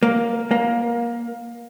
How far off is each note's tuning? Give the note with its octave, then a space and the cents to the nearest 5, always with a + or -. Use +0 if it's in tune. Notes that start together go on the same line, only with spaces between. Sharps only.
A#3 +5
A#3 +20